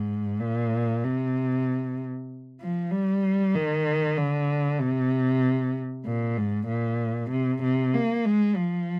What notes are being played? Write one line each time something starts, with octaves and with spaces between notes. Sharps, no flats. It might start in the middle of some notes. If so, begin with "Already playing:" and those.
Already playing: G#2
A#2
C3
F3
G3
D#3
D3
C3
A#2
G#2
A#2
C3
C3
A#3
G#3
F3